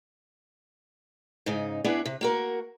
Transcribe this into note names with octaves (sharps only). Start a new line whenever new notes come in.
G#2 C#3 D#4
B3 D4 E4 G#4 D5
C3
A#3 F#4 A#4